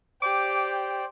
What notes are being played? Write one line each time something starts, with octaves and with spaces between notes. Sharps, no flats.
G4 C5 D5 G5 D6